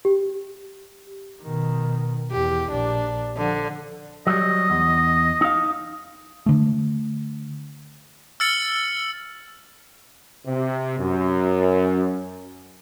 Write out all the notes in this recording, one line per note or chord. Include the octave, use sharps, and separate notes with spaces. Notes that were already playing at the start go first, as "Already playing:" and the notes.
G4
B2 D#3
E2 G4
A#1 D4
D3 F3
F#3 G3 D#5
E2
D#4 F5
D3 A3
E6 F6 A6 C#7 F#7
C3
F#2